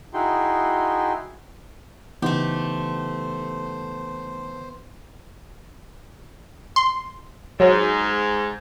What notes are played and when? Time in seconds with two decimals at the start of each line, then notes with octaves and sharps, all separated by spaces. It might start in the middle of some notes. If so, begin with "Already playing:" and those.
0.14 D#4 E4 F#4 G#4 G5 C6
2.22 C#3 E3 A3 B3 D#4 G4 C5
6.76 C6
7.60 G#2 F#3